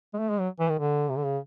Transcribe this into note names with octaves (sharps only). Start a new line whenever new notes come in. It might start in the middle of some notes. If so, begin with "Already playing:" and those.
G#3
A3
G#3
F#3
E3
D#3
D3
C3
D3
C#3